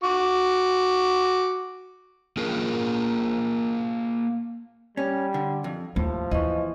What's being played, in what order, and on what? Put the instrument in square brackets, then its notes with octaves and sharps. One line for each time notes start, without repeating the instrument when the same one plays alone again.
[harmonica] F#4 D6
[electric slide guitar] A#3 F4 G#4 A#4
[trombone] G3 [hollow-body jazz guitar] C#4
[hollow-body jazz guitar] D3
F2
[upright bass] D#2 [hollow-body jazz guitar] A2 [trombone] F3
[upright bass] D#2 [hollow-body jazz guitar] E3 [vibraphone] D#5 C#6